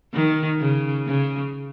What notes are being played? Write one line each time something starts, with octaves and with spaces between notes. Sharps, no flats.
D#3
C#3
C#3